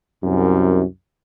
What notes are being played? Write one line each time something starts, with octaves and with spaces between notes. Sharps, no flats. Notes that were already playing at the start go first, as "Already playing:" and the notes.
C2 F#2